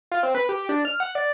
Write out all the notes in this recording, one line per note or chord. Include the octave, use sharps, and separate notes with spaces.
F4
C4
B4
G4
D4
F6
F#5
D5